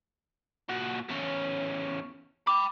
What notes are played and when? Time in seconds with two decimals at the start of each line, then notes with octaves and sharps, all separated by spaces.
0.69 A#2 F#4
1.09 E2 C#4
2.47 G5 B5 D6